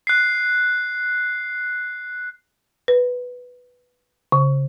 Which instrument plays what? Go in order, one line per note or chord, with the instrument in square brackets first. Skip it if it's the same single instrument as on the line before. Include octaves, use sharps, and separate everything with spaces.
[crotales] F#6 C7
[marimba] B4
C#3